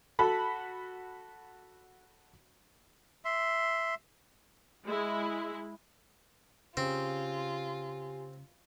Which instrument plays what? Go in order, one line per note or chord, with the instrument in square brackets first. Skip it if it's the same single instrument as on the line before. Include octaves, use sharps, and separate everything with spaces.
[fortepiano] F#4 A4 B5
[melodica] E5 C6
[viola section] G#3 E4
[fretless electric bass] C#3 [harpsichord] C4 [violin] F4 [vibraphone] G4 G#5